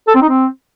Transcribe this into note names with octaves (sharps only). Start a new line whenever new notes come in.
A4
C4
D#4
C4